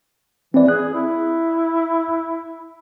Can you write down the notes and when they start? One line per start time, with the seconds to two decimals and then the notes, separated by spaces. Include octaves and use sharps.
0.54 E3 C4 D5
0.68 G#4 F#6
0.94 E4